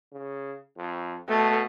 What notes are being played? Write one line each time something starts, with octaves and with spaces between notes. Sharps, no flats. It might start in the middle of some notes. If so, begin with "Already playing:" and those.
C#3
F2
B2 A3